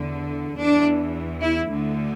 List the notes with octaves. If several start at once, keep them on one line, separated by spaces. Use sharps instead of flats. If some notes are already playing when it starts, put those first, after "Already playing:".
Already playing: E2 D3
E2 E3 D4
E4
D2 D3